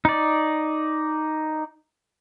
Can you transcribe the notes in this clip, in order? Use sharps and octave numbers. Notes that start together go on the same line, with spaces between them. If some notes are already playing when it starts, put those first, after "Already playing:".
D#4 D5